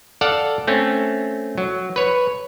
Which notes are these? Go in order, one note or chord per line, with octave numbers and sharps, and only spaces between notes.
A4 D5 F5 F#5
A3 C4 C#4
F#3
B4 C#5